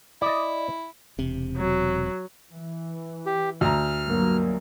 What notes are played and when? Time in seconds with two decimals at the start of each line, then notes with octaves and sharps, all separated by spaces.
0.22 E4 D5 D#5
1.19 E1 C3
1.57 F#3
2.52 E3
3.26 G4
3.61 D2 A#5 F6
4.04 G2 F#3 A#3